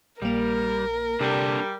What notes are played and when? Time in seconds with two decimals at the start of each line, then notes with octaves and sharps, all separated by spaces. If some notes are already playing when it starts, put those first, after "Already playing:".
0.22 A#1 G3 A#3 A#4
1.20 C3 G3 A#3 D4 A4